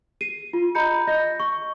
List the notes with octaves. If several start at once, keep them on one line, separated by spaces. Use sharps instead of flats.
C7 D#7
F4
D#5 A#5 B5 G6 C#7
D#5 G6 A#6
C#6